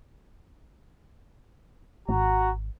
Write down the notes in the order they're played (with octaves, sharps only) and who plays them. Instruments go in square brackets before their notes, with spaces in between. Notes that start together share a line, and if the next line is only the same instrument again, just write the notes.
[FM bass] G#1 [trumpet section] F#4 A#5